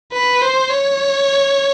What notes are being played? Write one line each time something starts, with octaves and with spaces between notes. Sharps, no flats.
B4
C5
C#5